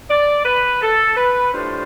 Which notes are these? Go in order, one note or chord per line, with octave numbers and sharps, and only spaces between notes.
D5
B4
A4
B4
A2 G3 D4 F4 C5